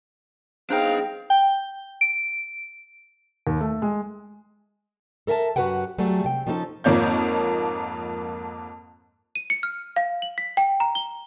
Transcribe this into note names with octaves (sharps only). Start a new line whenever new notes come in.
B3 C4 D4 D#4 G#4 F5 G5
G5
D7
D#2
A3
G#3
A4 A#4 E5 G#5 A5
F#2 F#4 G4 B4 F#5 G5
F#3 G3 A3 G#4 A4
C3 G5
F3 C#4 D#4 F#4 A4
F2 G#2 F3 A#3 C#5 G6
D#7
C#7
F6
F5
F#7
B6
G5
A#5
G7